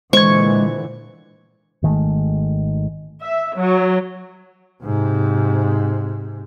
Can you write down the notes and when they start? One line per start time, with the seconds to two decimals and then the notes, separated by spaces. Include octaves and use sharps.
0.13 A#2 D3 E3 G#3 C5 C#6 G#6
1.83 G#1 D#3 G#3 A3
3.22 E5
3.57 F#3
4.84 G#2 C3